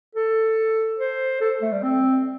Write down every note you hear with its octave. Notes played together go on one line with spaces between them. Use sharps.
A4
C5
A4
A3
G3
C4